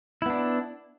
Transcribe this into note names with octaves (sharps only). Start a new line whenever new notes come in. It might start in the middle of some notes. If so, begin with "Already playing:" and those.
B3 D4 E4